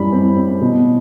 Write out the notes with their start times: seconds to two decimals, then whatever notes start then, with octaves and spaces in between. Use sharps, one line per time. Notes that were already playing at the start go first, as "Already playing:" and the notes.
Already playing: F#2 A2 G3 B5
0.12 C4
0.36 C4
0.61 B2